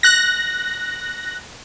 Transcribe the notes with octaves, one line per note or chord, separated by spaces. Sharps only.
F#6 A#6